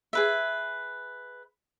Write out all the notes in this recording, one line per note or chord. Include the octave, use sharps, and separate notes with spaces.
G#4 B4 E5